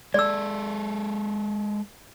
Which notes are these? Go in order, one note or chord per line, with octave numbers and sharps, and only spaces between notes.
G#3 A4 D5 E6